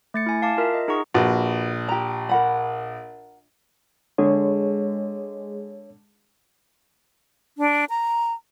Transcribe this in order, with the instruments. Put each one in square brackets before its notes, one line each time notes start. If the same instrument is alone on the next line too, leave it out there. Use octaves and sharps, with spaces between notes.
[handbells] A3 A6 C#7
E4 G#5
F5 A5 D6
F4 A#4 E5
D#5
D#4 G#4 F#5 A#5 C#6
[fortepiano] A#1 [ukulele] F#4 B4
[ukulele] G4 A#5
A#4 F#5 B5
[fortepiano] D3 [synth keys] G#3 [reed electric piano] C#5
[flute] D4
A#5